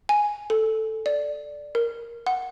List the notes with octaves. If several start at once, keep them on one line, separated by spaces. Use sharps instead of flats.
G#5
A4
D5
A#4
F#5